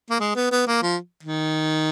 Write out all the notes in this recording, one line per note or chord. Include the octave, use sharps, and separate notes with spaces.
A#3
G#3
B3
B3
A#3
F3
D#3